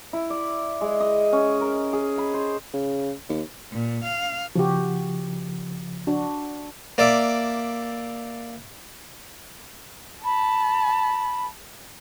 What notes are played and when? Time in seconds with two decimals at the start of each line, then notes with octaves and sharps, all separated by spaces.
0.13 E4
0.30 D5
0.81 G#3
1.00 D#5
1.32 C#4
1.61 A#4
1.93 G#4
2.18 B5
2.34 C5
2.74 C#3
3.29 D#2
3.73 A#2
4.04 F5
4.56 C#3 F3 F#4 G4
6.07 D4 F#4
6.98 A#3 D5 E5
10.24 A5 B5